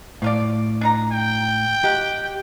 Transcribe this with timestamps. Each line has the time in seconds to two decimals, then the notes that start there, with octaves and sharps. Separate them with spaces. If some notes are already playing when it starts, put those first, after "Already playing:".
0.22 A2 F3 F4 D5
0.81 D4 D#4 A#5
1.12 G5
1.84 D#4 F4 G4 F#5